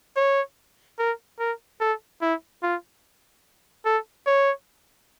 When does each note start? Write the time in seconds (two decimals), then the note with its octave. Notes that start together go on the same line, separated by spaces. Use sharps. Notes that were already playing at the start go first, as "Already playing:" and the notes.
0.16 C#5
0.99 A#4
1.39 A#4
1.80 A4
2.22 E4
2.63 F4
3.85 A4
4.26 C#5